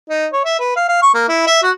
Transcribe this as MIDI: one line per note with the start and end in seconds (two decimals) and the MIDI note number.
0.09 0.27 63
0.32 0.42 73
0.45 0.57 76
0.59 0.73 71
0.76 0.88 77
0.88 1.01 77
1.02 1.11 85
1.14 1.25 58
1.29 1.46 64
1.47 1.61 76
1.63 1.71 66